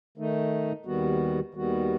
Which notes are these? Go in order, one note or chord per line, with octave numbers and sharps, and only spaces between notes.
D#3 A3 D#4
D#2 D#3 G3 B3 F#4
D#2 D#3 G3 B3 F#4